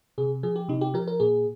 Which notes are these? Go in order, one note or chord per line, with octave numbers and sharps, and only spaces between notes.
C3 G#4
F3 G#4
G4
C3 D#4
G4
F3 A#4
A#4
A#2 G#4